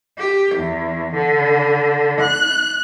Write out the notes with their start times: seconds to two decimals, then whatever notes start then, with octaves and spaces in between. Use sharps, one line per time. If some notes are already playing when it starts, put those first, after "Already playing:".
0.19 G4
0.55 E2
1.16 D3
2.20 F#6